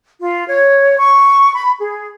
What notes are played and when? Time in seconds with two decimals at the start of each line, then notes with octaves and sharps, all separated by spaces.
0.20 F4
0.48 C#5
0.98 C#6
1.54 B5
1.79 G#4